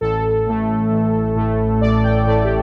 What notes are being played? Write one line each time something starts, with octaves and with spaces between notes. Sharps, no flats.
A1 A4
A2 A3
A1
A2 A3
A1 D5
G5
A2 A3 D5
G4